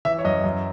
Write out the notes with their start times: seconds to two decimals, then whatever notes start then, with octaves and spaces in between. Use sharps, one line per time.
0.05 E3 E5
0.18 C#5
0.25 F#2 D#5
0.44 F#2